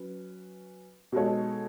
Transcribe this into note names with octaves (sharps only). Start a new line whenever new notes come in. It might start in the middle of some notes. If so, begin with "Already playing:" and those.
Already playing: F#3 C#4 B4
B2 G#3 D#4 A4 C#5